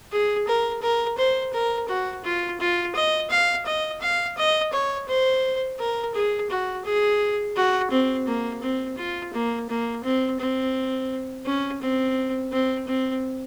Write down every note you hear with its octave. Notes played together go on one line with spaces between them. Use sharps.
G#4
A#4
A#4
C5
A#4
F#4
F4
F4
D#5
F5
D#5
F5
D#5
C#5
C5
A#4
G#4
F#4
G#4
F#4
C4
A#3
C4
F4
A#3
A#3
C4
C4
C#4
C4
C4
C4